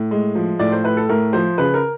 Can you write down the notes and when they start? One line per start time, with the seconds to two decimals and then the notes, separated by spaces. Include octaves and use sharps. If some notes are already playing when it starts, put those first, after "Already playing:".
Already playing: A2
0.11 G#3
0.35 F3
0.59 A2 D5
0.72 C5
0.84 A2 B4
0.97 A4
1.09 A2 A#4
1.33 F3 C5
1.58 C#3 B4
1.74 A#4